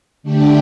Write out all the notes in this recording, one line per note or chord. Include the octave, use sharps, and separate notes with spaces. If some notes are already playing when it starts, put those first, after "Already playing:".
D3 A3 D4 G4